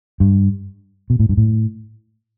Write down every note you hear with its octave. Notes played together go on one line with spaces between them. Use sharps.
G2
B2
A2
G2
A2